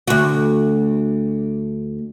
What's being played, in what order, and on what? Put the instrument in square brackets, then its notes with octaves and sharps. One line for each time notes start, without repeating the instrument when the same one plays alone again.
[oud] D2 F#4